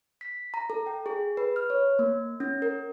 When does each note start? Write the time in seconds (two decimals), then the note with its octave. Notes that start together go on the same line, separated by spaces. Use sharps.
0.21 B6
0.54 A#5
0.70 A4
0.86 G5
1.06 G#4
1.37 B4
1.56 F6
1.70 C#5
1.99 A#3
2.40 C#4
2.62 A#4